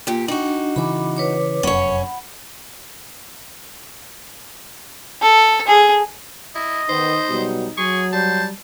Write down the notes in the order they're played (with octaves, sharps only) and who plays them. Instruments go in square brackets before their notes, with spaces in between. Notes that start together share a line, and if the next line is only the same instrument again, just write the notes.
[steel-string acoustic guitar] A#2 G4
[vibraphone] D4 [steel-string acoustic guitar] D#4 F#4
[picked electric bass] C#3 E3 [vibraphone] B5 D6
[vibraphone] B4 C#5 D6
[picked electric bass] F1 F#2 [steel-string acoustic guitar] C#4 C#5 [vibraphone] F#5 B5
[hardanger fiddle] A4
G#4
[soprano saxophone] E4 [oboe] D#5
[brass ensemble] D#3 B3 [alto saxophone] D#4 [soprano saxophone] C5
[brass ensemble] B2 F#3 G3
[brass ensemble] F#3 [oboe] G#4 [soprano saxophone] C#6
[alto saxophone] G3 [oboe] C5 [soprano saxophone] A5